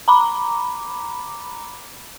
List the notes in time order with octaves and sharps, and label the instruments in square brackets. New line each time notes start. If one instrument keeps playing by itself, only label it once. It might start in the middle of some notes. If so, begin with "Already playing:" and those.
[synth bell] A#5 B5 D6